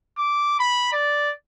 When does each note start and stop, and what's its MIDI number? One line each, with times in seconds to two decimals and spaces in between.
0.18 0.55 86
0.60 0.91 83
0.93 1.32 74